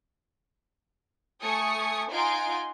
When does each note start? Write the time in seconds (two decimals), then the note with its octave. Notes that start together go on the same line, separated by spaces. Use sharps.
1.41 A3 G#5 C#6 D#6 C#7
2.11 D#4 F4 F#5 G#5 C6 D7